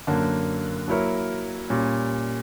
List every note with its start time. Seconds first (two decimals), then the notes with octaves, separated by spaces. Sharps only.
0.07 F#2 D3 A#3
0.88 F#3 A#3 E4 A#4 C#5
1.70 A#2 G3 C#4